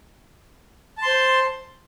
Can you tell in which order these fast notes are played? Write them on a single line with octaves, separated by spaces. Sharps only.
A5 C6 C5